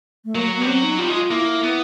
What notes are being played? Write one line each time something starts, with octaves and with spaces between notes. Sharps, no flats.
A3
F#3 A#3
B3
G3
F#3 C4
D#4
G3 F4
G#3
F4
A#3 E4
B3